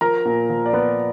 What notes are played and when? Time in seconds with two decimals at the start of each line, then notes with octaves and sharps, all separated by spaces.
0.01 F3 A#4 A#5
0.25 A#2
0.50 F3
0.66 D5
0.73 F3 B3 B4